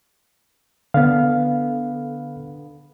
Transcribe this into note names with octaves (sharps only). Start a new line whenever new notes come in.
D3 B3 F5